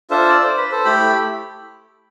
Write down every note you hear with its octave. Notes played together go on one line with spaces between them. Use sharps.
D4 F4 A4 C5 E5
D5
C5
B4
A4 C5
A3 E4 G4 G5 B5